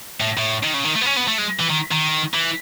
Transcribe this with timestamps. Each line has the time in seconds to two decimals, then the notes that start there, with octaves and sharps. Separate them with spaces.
0.20 A2
0.37 A2
0.63 D#3
0.74 C#3
0.84 D#3
0.95 A3
1.01 B3
1.06 C#4
1.16 B3
1.27 A3
1.38 G#3
1.59 E3
1.70 D#3
1.91 D#3
2.34 E3